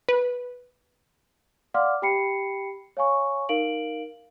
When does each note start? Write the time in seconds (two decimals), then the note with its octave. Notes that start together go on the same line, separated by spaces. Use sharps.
0.09 B4
1.74 D5 F5 F#5 C6 D6 F6
2.02 G4 G5 B5 C7 C#7
2.97 C#5 F5 G#5 C#6
3.49 D#4 A#4 F5 D7 F#7